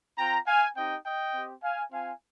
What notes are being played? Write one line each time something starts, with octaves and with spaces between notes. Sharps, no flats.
C4 F4 G5 A#5
F5 G#5
C4 D#4 G4 D#5 G5
D#5 G5
C4 G4
F5 G#5
C4 F4 F5 G#5